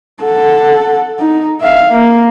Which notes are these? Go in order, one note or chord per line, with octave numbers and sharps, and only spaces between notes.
A4 F#5
D#4
E5 F5
A#3